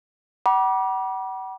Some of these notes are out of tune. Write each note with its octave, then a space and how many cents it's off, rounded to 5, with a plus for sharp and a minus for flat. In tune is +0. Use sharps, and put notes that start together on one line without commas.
F#5 +40 B5 -40 D6 +0